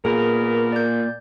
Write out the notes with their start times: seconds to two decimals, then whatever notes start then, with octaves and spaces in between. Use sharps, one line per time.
0.05 A#2 B3 G#4 A#4
0.72 D5 G6